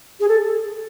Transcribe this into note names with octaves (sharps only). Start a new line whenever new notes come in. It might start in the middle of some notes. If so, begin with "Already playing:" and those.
G#4
A4